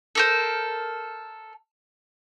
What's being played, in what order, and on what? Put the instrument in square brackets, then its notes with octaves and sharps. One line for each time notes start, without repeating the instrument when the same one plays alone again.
[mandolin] A4 A#4 C5